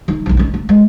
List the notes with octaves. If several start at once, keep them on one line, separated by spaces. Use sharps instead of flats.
D#3 D#4
B1 F#2
D#3 C#4
A#3
G#3